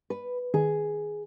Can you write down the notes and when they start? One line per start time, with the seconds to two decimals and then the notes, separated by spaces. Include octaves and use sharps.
0.10 B4
0.54 D#3 G#4